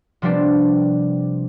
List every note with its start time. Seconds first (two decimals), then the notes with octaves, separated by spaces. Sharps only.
0.22 C3 F3 G3 B3 C4 D4